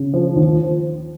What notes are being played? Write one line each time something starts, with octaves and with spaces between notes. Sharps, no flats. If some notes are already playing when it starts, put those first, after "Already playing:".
Already playing: C#3
F3
D#2